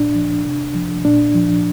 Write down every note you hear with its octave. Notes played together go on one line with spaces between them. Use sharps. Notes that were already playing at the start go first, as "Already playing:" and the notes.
Already playing: A#2 D4
F3
C3
F3
A#2 D4
F3